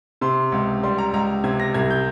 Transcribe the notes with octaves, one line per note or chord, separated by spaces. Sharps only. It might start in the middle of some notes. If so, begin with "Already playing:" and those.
C3 C6
C#2
G3 C6
A#5
C#2 A#5
C3 G#6
A#6
C2 G#6
G6